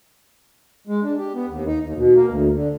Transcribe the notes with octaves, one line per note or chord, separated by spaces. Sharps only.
G#3
D4
G4
B3
D#2
D#4
D#2
B2
A#3
D2
D3